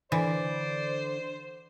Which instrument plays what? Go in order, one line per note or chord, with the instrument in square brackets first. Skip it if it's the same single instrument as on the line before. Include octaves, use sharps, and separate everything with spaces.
[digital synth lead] D3 [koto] E3 [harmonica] C5 [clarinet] D5